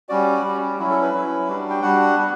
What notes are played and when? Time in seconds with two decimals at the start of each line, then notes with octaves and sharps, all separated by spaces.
0.09 G3 C#4 F#4 D5
0.44 G3 C#4 F#4
0.78 F#3 C#4 E4 F#4
0.90 A4
1.02 B4
1.13 F#3 C#4 E4
1.48 G3 D4 F#4
1.70 G5
1.82 G3 D4 F#4 F#5
2.18 B3 F#4